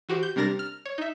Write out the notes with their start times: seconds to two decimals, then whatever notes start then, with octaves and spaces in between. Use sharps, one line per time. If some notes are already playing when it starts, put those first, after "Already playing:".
0.09 E3 F#4 G4 C5
0.23 G6
0.36 C3 G3 D4 A#4 A6 A#6
0.59 F6
0.86 C#5
0.98 D#4 E5